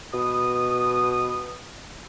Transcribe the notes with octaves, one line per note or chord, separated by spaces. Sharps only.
B2 D#6